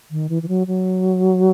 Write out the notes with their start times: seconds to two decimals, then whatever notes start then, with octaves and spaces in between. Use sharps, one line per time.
0.11 D#3
0.29 E3
0.43 E3
0.48 F#3
0.67 F#3